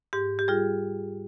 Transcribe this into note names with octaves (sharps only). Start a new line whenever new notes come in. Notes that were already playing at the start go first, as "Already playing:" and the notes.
G#2 G4
G4
G3 F4 G#4